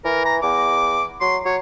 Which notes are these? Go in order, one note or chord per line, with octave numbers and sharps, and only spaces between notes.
E3 A#4
A#5
E2 D6
F#3 C6
F#3 C#5